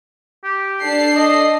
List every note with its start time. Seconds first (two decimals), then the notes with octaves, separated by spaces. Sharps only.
0.44 G4
0.81 D4 A4 C7
1.15 D#5